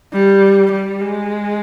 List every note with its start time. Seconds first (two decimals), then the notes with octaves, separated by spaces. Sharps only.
0.13 G3
0.71 G3
1.01 G#3